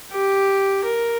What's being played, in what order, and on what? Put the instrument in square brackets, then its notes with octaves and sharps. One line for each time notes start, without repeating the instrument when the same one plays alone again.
[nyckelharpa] G4
A#4